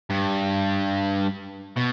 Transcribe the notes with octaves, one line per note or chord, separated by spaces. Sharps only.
G2
B2